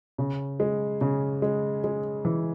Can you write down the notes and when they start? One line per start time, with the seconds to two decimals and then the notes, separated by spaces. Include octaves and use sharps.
0.18 C#3
0.60 G#3
1.01 C#3
1.42 G#3
1.84 G#3
2.25 E3